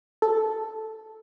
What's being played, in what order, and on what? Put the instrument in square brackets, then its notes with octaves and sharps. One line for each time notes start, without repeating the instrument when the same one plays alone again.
[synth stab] A4